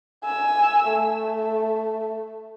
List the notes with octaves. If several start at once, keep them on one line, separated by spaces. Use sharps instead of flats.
G#5 E6
A3